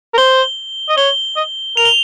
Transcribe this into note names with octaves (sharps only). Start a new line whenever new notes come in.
A#4
C5 G7
D#5
C#5 G7
D#5
A#4 F7
G7